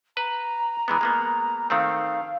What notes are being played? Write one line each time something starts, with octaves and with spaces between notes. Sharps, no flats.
B4 A#5
E3 G#3 B3
G#3 A#3 B3
D#3 A3 C4 F5